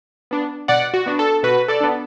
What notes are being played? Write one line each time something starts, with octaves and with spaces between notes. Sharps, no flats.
B3 D4
B2 D5 F#5
F#4
B3 D4
A4
B2 F#4 B4
A4 D5
B3 D4